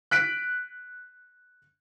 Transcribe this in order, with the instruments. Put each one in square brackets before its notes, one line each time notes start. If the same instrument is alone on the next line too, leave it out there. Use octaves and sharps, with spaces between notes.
[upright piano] F#6 B6 D7